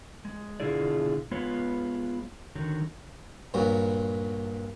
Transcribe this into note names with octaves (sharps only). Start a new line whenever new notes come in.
G#3
B2 D3 E4 F4 G#4 D5
G#3 B3 F4 B4 C#5
D3 D#3 F#3
G2 A#2 F#3